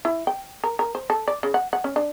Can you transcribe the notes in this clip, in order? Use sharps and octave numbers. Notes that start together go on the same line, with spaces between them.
E4
G5
A#4
A#4
C5
A4
D5
C#3
F#5
F#5
C#4
D4